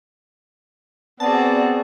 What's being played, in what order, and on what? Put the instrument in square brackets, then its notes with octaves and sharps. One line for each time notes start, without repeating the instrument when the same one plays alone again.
[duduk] B3 [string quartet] C4 F#4 G#4 [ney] D5 [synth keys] A5